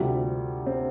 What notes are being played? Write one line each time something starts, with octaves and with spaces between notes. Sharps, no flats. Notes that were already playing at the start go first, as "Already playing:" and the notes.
Already playing: D2 C3 G3 F4
C4